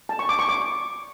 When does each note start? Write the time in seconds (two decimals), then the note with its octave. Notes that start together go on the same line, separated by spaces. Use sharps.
0.09 A5
0.19 C#6
0.29 D6
0.39 C#6
0.49 D6